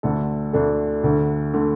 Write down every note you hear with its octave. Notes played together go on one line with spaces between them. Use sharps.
D2 D3 A3 D4 A4
D2 D3 A3 D4 A4
D2 D3 A3
D3 A3